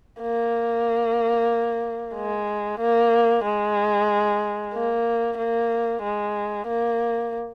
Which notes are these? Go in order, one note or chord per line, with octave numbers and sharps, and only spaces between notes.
A#3
G#3
A#3
G#3
A#3
A#3
G#3
A#3